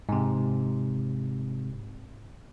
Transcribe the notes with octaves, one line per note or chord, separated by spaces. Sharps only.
G#2 C3